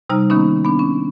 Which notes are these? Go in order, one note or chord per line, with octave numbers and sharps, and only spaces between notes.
C3 G3 D#4 A#5 F6
D#3 A#3 B3 C#4 D#4
B3 D4
C#4